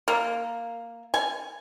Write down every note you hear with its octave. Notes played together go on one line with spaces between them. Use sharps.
A#3
G#5